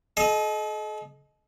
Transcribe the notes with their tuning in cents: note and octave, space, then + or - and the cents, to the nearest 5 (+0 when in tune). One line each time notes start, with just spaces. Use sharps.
A4 -45 D#5 +0